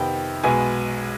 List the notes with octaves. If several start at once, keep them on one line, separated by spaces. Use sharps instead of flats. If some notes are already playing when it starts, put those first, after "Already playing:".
Already playing: F2 C3 D#3 B3 G5
B1 B2 G#3 B3 G#5